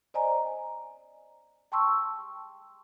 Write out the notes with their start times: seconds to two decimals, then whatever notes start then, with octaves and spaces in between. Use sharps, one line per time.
0.14 C5 D5 D#5 G#5 A#5
1.72 G5 A5 C6 C#6 E6